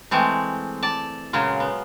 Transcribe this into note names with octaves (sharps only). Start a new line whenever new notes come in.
E3 G#3 A3 C4
D5 A5
A#2 C#3 F#3 G#3 F4
B3